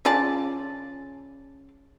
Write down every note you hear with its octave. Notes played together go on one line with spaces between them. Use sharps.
C#3 F4 D5 A5